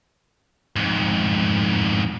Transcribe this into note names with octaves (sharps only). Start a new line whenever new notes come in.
F2 G#2